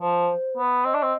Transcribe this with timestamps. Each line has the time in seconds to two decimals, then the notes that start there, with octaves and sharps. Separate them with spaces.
0.01 F3 C5
0.57 B3
0.85 C4 D#5
0.94 D4
1.03 C4